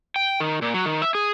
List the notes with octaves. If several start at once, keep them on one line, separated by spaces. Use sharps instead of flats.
G5
D#3
A#2
F#3
D#3
E5
G#4